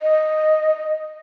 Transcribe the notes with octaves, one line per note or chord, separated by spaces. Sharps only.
D#5